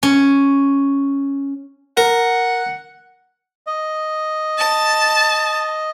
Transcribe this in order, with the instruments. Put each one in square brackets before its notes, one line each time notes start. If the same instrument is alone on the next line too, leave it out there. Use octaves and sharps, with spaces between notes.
[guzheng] C#4
[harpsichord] A#4 [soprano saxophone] F#5
[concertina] D#5
[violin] A5